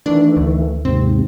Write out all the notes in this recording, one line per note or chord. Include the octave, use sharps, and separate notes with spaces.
D#3 E3 A3 D4
D2
D#2 G#2 C3 C4